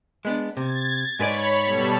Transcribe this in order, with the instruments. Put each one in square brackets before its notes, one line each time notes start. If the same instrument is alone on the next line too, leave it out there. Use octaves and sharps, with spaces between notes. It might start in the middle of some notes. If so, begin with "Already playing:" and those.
[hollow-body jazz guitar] G#3 B3 D4
[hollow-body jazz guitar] C3 [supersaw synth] G#6 A6
[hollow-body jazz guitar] G#2 B4 D5 [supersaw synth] C#5 B5
[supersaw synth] B2 G3 A4